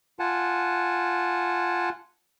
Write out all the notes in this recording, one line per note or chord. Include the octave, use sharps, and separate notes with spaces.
F4 F#5 G#5 A5